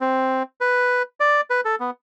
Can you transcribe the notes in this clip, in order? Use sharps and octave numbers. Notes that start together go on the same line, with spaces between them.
C4
B4
D5
B4
A4
B3